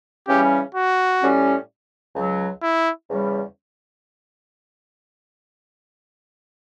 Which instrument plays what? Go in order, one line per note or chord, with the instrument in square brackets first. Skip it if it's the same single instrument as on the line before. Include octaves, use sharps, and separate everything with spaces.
[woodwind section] C#3 E3 G3 C#4 [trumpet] G4
[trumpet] F#4
[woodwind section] A2 G3 C#4
C#2 C#3 F#3
[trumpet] E4
[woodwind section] E2 C#3 G3 C#4